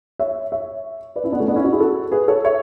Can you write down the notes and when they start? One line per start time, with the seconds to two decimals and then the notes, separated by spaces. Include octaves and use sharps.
0.19 C#5 E5
0.52 C#5 E5
1.16 B4 D5
1.24 C#4 E4
1.32 B3 D4
1.39 A3 C#4
1.48 B3 D4
1.56 C#4 E4
1.64 D4 F#4
1.72 E4 G#4
1.80 F#4 A4
2.12 G#4 B4
2.28 A4 C#5
2.44 C#5 E5